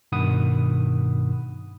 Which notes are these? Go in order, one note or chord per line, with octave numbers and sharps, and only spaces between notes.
G2 B2 D#3 F#5 B5 D#6